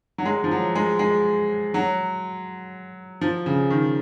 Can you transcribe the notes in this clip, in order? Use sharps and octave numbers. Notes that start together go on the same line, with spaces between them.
F#3
G#3
F3
F#3
G#3
G#3
F#3
F3
C#3
D#3